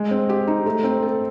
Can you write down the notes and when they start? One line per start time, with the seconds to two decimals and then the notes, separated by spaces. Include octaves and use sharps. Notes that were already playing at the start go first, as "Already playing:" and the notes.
Already playing: G#3
0.11 C4
0.29 G4
0.47 D#4
0.66 A3
0.84 C4
1.02 A4